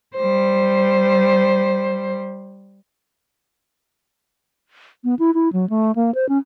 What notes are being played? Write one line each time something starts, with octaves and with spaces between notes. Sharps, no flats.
G3 C5
B3
E4
E4
F#3
A3
A#3
C5
C#4